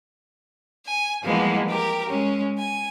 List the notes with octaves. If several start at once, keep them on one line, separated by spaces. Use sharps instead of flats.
G#5
E3 F3 G3 G#3 A#3 B3
G4 A#4
G#3 C#4
G#5